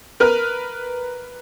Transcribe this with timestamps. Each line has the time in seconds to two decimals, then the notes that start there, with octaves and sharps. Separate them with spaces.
0.20 A#4 B4 F6